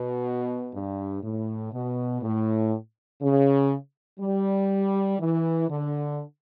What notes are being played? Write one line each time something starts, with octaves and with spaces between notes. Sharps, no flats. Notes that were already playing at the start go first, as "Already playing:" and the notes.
Already playing: B2
G2
A2
B2
A2
C#3
G3
E3
D3